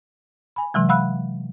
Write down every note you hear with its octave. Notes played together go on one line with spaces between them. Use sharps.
G#5 B5
C3 E3 F#3 G#3
F5 F#5 B5 E6 F#6